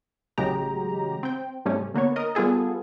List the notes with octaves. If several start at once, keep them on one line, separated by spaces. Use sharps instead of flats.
A1 C#3 F#3 G#3 G4 A#5
C4 G5
G#2 C3 G3 A3 C#4
D3 A#3 B3 C#5
A#4 D#5
G3 B3 F4 G#4 A4